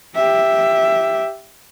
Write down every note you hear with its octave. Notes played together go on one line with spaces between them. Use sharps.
G4 E5